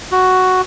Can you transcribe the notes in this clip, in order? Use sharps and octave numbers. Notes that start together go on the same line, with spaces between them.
F#4